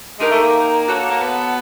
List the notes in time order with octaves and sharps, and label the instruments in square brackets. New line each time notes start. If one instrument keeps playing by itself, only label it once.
[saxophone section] G#3 [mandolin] D#4 G4 A#4
[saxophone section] A3
A#3
[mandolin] F#4 A4 C#5 F#5
[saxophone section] A#3
B3